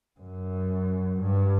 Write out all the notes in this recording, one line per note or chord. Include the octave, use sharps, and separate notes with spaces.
F#2
G2